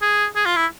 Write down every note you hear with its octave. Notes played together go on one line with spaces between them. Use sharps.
G#4
G#4
F4
E4